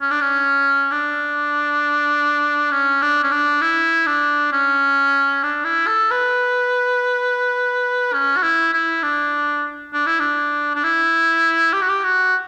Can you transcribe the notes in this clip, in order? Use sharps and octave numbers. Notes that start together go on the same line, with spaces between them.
C#4
D4
C#4
D4
C#4
D4
C#4
D4
E4
D4
C#4
D4
E4
A4
B4
C#4
F#4
E4
E4
D4
D4
E4
D4
D4
E4
G4
F#4
G4
F#4